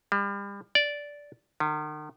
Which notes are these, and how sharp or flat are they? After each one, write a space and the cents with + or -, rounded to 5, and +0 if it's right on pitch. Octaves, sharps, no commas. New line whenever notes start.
G3 +35
D5 -10
D#3 -40